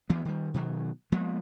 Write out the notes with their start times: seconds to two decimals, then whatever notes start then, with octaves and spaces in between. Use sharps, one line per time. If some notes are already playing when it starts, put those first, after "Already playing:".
0.10 D2 E3 B3
0.25 D#3 G3
0.54 B2 D#3 E3 F#3
1.12 F3 G#3 A#3 B3